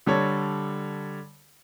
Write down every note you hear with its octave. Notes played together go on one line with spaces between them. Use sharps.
D3 G3 A4 C#5